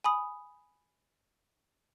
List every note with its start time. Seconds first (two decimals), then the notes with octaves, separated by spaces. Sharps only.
0.04 G#5 B5 D#6